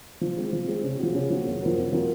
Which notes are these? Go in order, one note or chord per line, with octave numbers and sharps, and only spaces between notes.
F3
G#3 C4
F3
G#3 C4
C#3
F3 A#3 C#4 F#4
C#3
F3 A#3 C#4 F#4
F#2
F3 C4 F#4 A#4
F#2
F3 C4 F#4 A#4